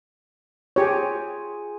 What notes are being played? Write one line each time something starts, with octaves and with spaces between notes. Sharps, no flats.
F4 G4 G#4 C#5 G#5